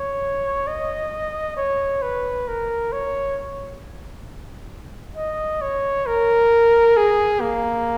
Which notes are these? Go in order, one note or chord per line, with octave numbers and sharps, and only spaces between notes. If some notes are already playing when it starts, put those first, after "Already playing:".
Already playing: C#5
D#5
C#5
B4
A#4
C#5
D#5
C#5
A#4
G#4
A#3